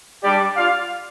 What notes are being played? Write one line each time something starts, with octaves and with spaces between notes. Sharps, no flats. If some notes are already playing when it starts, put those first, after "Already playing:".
G3 D4 G4 D5
F4 D5 F5